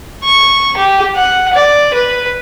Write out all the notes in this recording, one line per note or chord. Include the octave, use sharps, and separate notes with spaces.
C#6
G4
F#5
D5
B4